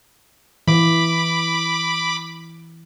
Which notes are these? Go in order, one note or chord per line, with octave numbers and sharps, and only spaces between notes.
E3 B5 D6